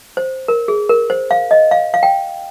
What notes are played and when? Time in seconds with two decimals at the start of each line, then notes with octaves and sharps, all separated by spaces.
0.17 C5
0.48 A#4
0.68 G#4
0.89 A#4
1.10 C5
1.31 F5
1.51 D#5
1.71 F5
1.94 F5
2.03 G5